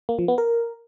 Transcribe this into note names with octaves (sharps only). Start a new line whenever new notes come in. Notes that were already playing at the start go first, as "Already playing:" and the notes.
A#3
F3
B3
A#4